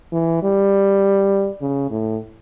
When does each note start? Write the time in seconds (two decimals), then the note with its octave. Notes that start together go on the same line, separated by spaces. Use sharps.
0.13 E3
0.43 G3
1.61 C#3
1.91 A2